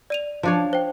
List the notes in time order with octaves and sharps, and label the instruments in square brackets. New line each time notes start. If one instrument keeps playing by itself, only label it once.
[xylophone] D5 D#7 F7
[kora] F3 D4 C#5
[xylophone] C5 G5